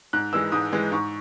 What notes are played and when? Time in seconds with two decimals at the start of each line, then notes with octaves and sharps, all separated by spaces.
0.13 G#2 F#6
0.33 E3 G#3 E6
0.52 G#2 D#6
0.72 E3 G#3
0.92 G#2 C#6